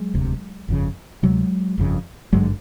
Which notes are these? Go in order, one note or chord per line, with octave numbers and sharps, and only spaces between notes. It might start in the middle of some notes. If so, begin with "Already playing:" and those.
Already playing: F#3 G#3
E1 D2 C3
G1 F2 C#3
D2 C3 F#3 G#3
G1 F2 C#3
G#1 G2 D3 F#3 G#3